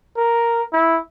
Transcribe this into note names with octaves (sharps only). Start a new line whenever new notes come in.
A#4
E4